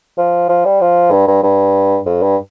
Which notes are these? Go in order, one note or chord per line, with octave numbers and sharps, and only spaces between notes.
F3
F3
G3
F3
G2
G2
G2
F2
G2